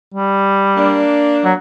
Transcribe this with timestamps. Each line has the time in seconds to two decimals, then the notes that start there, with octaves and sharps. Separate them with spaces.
0.14 G3
0.77 A#3 D4
1.45 F#3